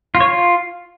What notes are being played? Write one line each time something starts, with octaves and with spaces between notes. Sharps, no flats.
F4
C#5
F4